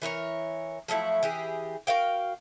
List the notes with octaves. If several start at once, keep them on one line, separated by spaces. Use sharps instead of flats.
E3 A#4 C5 C#5
F3 F#3 A3 E4
E3 G4 G#4
F#4 A#4 F5 G5